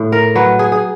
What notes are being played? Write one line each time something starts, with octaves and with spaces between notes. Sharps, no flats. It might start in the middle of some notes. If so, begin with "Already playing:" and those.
Already playing: A2
A#4
F#3 B4
G#4
G#4